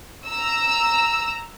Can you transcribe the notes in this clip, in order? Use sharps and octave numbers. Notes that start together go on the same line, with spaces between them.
A#5 E6